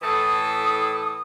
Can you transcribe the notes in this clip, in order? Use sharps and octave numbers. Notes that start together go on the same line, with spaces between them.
A2 E3 A4 D#6